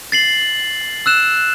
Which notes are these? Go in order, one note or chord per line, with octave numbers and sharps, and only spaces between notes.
A6 C7 F#7
E6 F#6 E7